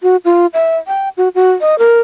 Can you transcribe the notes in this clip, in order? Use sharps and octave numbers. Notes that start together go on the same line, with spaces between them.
F#4
F4
E5
G5
F#4
F#4
D#5
A#4